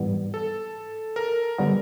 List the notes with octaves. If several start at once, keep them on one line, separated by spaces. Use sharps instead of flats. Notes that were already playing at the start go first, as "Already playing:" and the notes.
Already playing: G#2 E3 G3 B3
A4
A#4
D3 G3 B3